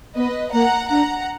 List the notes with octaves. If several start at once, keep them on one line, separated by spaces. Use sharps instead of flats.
B3 B4 D#5
A#3 F#5 A#5
D4 F#5 A#5